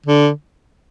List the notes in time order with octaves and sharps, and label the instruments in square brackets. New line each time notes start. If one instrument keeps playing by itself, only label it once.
[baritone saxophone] D3